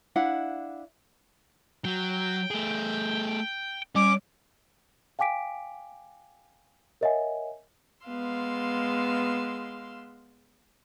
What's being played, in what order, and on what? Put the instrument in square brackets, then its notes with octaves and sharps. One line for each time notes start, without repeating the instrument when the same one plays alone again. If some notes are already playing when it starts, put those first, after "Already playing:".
[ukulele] D4 E4 F5 F#5
[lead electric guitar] F#3 [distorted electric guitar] G5
[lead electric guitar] A3 G#4
[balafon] G3 [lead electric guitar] C#4 [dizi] D6
[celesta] F5 G5 G#5 D6 B6 D7
A#4 C#5 D#5 E5 F#5 G#5
[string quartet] G#3 B3 F5 C6 E6